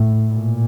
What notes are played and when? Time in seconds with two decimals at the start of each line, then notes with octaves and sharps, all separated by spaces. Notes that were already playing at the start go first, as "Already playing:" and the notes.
Already playing: A2
0.33 A#2